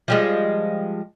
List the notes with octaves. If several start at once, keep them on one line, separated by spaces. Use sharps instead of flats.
F3 G3 G#3